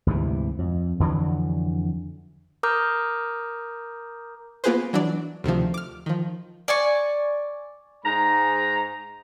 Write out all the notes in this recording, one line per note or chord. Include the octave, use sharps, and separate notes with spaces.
D2 G#2 C3 E3
F2
F2 D3 E3 F#3
A#4 A#5 D6 D#6 F6 G6
A#3 B3 F4 G#4 B4 C5
E3 F#3 D4 D5
D2 C3 D#3 F3
D6 F6
D#3 F3
D5 G#5 C#6
G#2 A#5